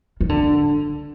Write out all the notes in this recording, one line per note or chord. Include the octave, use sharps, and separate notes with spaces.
D#3
D3